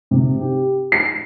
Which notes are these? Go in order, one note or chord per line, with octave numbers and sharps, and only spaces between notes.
C3
G4
C7